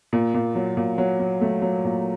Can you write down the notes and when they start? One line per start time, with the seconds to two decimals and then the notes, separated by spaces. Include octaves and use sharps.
0.13 A#2
0.34 A#2
0.55 F#3
0.77 A#2
0.98 F#3
1.20 F#3
1.41 A3
1.62 F#3
1.84 A#2